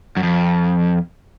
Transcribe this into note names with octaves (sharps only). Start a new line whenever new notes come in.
F#2
F2